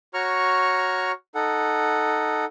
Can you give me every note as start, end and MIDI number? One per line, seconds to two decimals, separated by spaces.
0.14 1.12 66
0.14 1.12 73
0.14 1.12 82
0.14 1.12 85
0.14 1.12 89
1.35 2.45 63
1.35 2.45 69
1.35 2.45 78